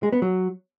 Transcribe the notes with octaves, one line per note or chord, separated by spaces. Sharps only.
G#3
B3
F#3